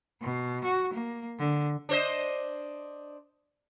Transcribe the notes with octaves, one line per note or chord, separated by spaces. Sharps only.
B2
F#4
A#3
D3
D4 C5 D#5